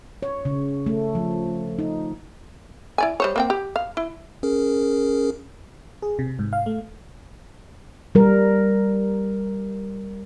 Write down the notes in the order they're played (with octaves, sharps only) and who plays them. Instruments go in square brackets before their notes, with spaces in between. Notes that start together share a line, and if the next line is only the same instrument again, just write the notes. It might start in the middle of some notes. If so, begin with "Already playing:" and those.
[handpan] C#5
C#3
A3
F3
D#4
[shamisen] E4 D5 G#5
G3 C5 C#5
A#3 C4 G5
G4
F5
E4
[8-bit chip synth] C#4 G#4 A#4
[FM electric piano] G#4
C3
G#2
F5
A3
[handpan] G3 A#4